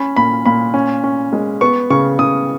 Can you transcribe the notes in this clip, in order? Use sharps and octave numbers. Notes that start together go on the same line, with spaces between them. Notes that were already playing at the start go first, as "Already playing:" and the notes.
Already playing: C#4 B5
A#2 B5
A#2 B5
C#4
C#4
G#3
B3 C#6
C#3 C#6
C#3 D#6